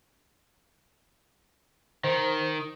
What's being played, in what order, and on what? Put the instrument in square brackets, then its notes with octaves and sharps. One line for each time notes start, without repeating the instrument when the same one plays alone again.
[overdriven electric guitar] D#3 [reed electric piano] C5